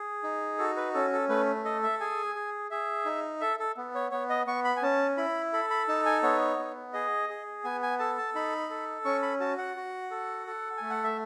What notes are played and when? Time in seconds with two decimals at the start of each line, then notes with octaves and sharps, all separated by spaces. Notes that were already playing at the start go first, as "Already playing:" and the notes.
Already playing: G#4
0.23 D#4
0.59 F#4 A4
0.77 B4
0.94 C#4 A4
1.13 A4
1.29 A3 B4
1.65 A4 D#5
1.83 E5
2.01 G#4 G#5
2.35 G#4
2.71 G#4 E5
3.05 D#4
3.41 A4 E5
3.59 A4
3.77 B3
3.95 C#5
4.11 B3 C#5
4.29 D#5
4.47 B3 C#6
4.65 B5
4.76 G#5
4.82 C#4 A5
5.17 E4 B5
5.53 A4 B5
5.70 B5
5.88 D#4 A5
6.06 G#5
6.23 B3 C#5
6.59 B3
6.93 G#4 D#5
7.29 G#4
7.64 B3 G#5
7.83 G#5
7.99 A4 A5
8.18 A5
8.35 D#4 B5
8.70 A4
9.05 C#4 C#6
9.22 B5
9.40 F#4 A5
9.58 F#5
9.76 F#4
10.11 A4
10.47 A4
10.77 A3 G#5
10.90 F#5
11.04 E5